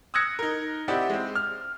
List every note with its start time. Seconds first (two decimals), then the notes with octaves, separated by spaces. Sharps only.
0.14 D#6 E6 F#6 G#6 A#6 C#7
0.39 D#4 A#4
0.88 C4 E4 G4 D5 D#5 F#5
1.10 G#3 C4
1.35 F6